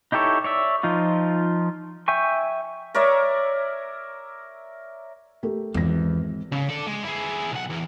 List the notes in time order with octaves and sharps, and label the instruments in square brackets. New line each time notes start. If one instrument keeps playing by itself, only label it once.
[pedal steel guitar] D#4 E4 G4 A4 C#5
C#5 D5 E5
F3 D#4 F4
E5 G5 G#5 C#6
[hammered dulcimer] A#4 C#5 D5 E5
[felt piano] A3 G4 A#4
[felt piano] G#1 A#6 [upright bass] E2
[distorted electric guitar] C#3
A4 D5
G#3
E4 G#4
B1 F#5
E2